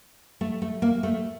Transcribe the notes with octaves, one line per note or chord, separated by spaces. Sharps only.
A3
A3
A#3
A3